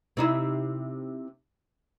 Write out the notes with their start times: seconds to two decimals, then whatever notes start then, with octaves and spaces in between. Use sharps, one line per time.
0.17 C3 D#4 E4